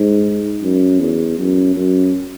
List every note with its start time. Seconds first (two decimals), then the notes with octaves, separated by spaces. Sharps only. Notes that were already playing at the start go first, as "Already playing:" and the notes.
Already playing: G#2
0.62 F#2
1.00 E2
1.39 F#2
1.76 F#2